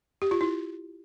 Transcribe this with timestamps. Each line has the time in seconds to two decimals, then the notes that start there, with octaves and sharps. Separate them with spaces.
0.22 G4
0.31 F4
0.41 E4